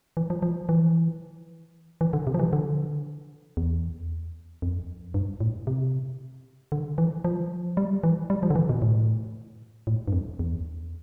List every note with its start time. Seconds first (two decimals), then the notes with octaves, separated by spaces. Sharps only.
0.17 E3
0.30 F3
0.42 F3
0.69 E3
2.01 E3
2.13 D3
2.27 C3
2.34 F3
2.39 E3
2.53 D3
3.57 E2
4.62 F2
5.14 G2
5.40 A2
5.67 C3
6.72 D3
6.98 E3
7.25 F3
7.77 G3
8.03 E3
8.30 G3
8.43 F3
8.50 D3
8.55 E3
8.69 B2
8.82 A2
9.87 A2
10.08 G2
10.13 F2
10.39 E2